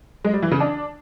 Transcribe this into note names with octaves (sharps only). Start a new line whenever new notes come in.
G#3
G3
E3
C#3
D4